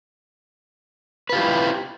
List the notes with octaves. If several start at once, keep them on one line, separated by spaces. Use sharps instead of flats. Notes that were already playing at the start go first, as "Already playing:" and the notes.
E4 F4 G4 B4